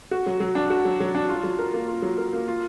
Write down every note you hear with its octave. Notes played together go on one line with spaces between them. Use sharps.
F#4
F#3
F#3
D4
F#4
F#3
F#3
D4
F4
F#3
A#4
A#3
F4
F#3
A#4
A#3
F4